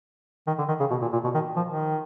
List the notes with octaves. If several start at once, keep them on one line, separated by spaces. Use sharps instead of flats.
D#3
D3
D#3
C#3
B2
A#2
A#2
B2
D#3
F3
D#3